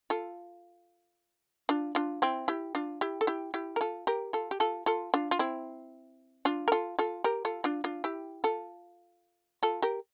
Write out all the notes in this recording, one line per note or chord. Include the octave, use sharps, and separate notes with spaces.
F4 A4
D4 F4
D4 F4
C4 E4
E4 G4
D4 F4
E4 G4
A4
E4 G4
E4 G4
A#4
F4 A4
G4 A#4
F4 A4
G4
F4 A4
F4 A4
D4 F4
F4
C4 E4
D4 F4
A#4
F4 A4
F4 A4
G4 A#4
F4 A4
D4 F4
D4 F4
E4 G4
F4 A4
F4 A4
G4 A#4